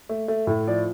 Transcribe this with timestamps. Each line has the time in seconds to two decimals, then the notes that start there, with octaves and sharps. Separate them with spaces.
0.09 A3
0.28 A3
0.47 A2
0.67 F3 D5